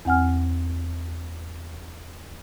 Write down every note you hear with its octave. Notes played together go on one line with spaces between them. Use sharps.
E2 C4 F#5 G#5 F6